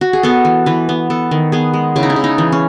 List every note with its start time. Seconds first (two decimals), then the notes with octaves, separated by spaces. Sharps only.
0.01 F#4
0.13 G#4
0.23 B3 A4
0.45 E3
0.66 E3 B4
0.89 B3
1.10 B3 A4
1.31 D#3
1.52 B3 G#4
1.74 G#3
1.96 C#3 E4
2.03 D#4
2.10 E4
2.16 C#3
2.24 D#4
2.38 E3
2.52 C#4